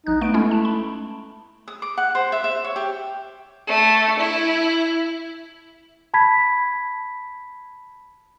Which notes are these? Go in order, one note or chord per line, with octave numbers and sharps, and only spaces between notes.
A#1 D#4 F#6
A3 B3 D7
G#3 A3 C#4 E4
A5
B5
D#6
D6
F#5
C5
E5
E5
C#5
G4
A3
E4
A5 B5 G#6 B6